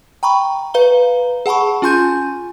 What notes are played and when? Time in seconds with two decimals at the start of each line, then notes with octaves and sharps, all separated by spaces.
0.23 G5 A#5 B5 C#6
0.74 B4 F5 A#5 G7
1.46 G#4 F#5 A5 B5 C#6
1.82 C#4 F4 G#5 C6 G6 D#7